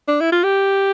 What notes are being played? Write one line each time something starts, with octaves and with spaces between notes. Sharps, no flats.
D4
E4
F4
G4